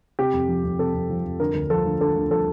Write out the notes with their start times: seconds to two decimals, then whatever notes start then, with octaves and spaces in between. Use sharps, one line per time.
0.19 C3 G4
0.33 F2
0.49 F3
0.64 F2
0.79 C3 A4
0.94 F2
1.10 F3
1.25 F2
1.40 D3 A#4
1.55 D2
1.70 F3 A4
1.85 D2
2.00 D3 A4
2.16 D2
2.31 F3 A4